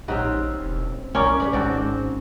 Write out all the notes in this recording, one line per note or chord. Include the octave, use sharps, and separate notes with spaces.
A#1 C4 C#4 D#4 G4 F#5
E1
C2 C#4 G4 A#4 D5
G4 B4 D5
G#1 G#2 C4 D4 F#4 G4 D5